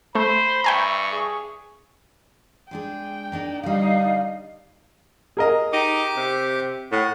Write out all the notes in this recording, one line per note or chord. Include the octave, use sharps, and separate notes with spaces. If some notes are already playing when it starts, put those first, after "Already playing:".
A3 C5 B5
G2 E5 G5 G#5 A#5 C#6
G#4
G#3 D4 G#4 G5
A#3 D4 D#4
D3 G3 D#4 F5
G#4 A#4 D#5
D#4 G4 D6
C3
A2 F#5